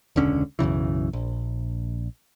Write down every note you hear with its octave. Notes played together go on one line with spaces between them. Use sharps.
E1 C#2 D3 C#4
B1 F#2 C#3 E3
A#1